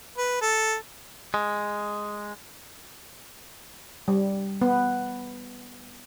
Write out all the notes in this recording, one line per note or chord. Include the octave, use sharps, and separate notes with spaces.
B4
A4
G#3
G3
B3